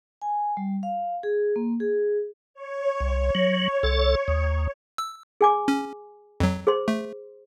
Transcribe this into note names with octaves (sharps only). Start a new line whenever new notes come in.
G#5
G3
F5
G#4
A#3
G#4
C#5
C2
F#3
C2 A4
D#2
E6
G#4 G#5 D6
C#4
F2 F#3
G#4 C5 C6
A3